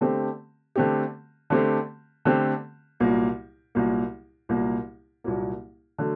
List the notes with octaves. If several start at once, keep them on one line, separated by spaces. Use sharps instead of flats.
D3 A3 C4 G4
D3 A3 C4 G4
D3 A3 C4 G4
D3 A3 C4 G4
C2 A#2 F#3 A#3
C2 A#2 F#3 A#3
C2 A#2 F#3 A#3
C2 A#2 F#3 A#3
D3 F#3 A3